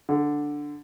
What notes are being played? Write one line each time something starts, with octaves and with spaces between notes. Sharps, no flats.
D3